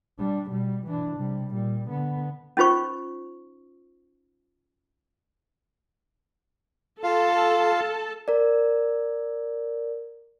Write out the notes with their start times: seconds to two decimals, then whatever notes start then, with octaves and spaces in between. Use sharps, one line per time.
0.19 G3 D4
0.50 B2 G3
0.87 E3 D4
1.16 C3 G3
1.54 A#2 G3
1.89 D3 B3
2.57 C#4 D#4 F4 C5 C#6
7.04 F4 A4 F5 A5
8.28 A#4 D5